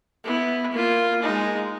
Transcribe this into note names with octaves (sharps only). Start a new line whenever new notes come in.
B3 E4
A#3 F4
G#3 D#4